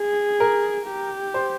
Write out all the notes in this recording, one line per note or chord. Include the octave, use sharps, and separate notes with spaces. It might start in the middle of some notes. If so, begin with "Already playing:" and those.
Already playing: G#4
A#4
G4
C5